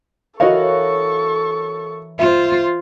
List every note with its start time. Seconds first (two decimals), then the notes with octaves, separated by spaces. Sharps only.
0.40 E3 F#4 A4 A#4 C#5 D#5 F5 C#6
2.19 F4 C5 E5